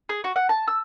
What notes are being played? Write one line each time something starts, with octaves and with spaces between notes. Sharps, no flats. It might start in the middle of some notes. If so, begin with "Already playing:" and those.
G#4
F#4
F#5
A5
E6